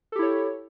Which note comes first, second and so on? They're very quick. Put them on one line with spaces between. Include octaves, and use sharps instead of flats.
A4 G4 E4 C#5